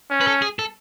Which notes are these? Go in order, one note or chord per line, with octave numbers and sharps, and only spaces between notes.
C#4
B4
A4
G#4
A4